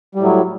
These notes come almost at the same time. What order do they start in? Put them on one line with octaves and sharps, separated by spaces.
G3 A2 F#3